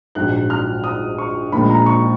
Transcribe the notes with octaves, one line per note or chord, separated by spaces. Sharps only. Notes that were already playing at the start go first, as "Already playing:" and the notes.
A#1 G#2 F#3 F#6
F6
D#6
C#6
A#1 A#2 F3 G#3 B5
A#5
C#6